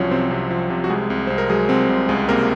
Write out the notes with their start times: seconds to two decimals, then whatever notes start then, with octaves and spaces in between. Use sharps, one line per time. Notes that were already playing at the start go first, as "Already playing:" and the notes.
Already playing: C2 F3 F#3 C#4 F4 C#5 F5
0.11 C3 C4 C5
0.31 C3
0.50 F3
0.70 C3
0.84 F#4
0.90 C2 G#3 G#4
1.10 C2
1.27 C2 C5
1.38 A#4
1.49 F#3 G#3 G#4
1.69 C2 C4
1.89 C2
2.08 C#2 G#3 G#4
2.29 C3 A#3 A#4